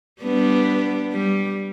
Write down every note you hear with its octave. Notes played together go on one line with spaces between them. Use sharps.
G3 B3 D4
G3